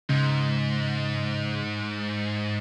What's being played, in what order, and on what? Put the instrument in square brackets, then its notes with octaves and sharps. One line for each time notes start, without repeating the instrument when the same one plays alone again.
[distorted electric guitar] G#2 [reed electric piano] C#3